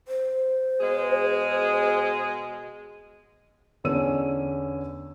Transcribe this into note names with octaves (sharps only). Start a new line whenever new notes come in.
C5
B2 G#3 G#4
E2 D3 C#4 E6 D#7